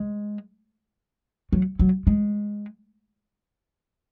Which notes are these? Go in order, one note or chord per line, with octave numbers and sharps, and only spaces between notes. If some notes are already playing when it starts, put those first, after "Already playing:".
Already playing: G#3
F#3
F#3
G#3